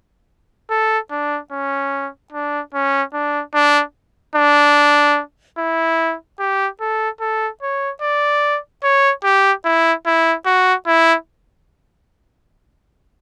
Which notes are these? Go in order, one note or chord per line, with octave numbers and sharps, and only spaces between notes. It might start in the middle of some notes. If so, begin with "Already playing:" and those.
A4
D4
C#4
D4
C#4
D4
D4
D4
E4
G4
A4
A4
C#5
D5
C#5
G4
E4
E4
F#4
E4